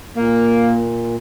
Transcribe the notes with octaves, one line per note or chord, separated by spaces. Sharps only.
A#2 A#3